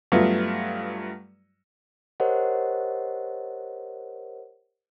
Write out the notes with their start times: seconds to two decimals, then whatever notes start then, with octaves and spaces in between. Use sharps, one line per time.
0.12 G2 F#3 A3 B3 F4
2.20 G4 A#4 C5 C#5 D#5 F#5